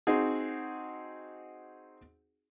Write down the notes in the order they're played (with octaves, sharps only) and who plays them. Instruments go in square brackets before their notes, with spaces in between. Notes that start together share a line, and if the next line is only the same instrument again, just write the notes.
[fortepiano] C4 D#4 F#4 G#4